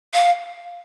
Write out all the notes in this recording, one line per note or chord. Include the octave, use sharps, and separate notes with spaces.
F5